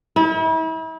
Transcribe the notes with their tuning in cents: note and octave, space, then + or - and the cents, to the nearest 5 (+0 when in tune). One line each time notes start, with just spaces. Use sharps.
E4 -40